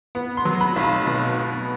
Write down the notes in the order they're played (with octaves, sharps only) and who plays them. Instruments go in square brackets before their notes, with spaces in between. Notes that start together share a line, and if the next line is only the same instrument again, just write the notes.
[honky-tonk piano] B3
[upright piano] C6
[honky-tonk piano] F#3
[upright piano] B5
[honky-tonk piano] B1
[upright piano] B5
[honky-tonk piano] B2
B3